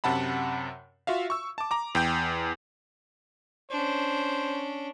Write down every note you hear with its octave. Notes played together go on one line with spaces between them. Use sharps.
F#2 C3 F#5 A5 B5
F4 F#4 E5 F5
C#6 E6
A5 D6
A#5 D6
E2 G5 G6
C#4 D4 C5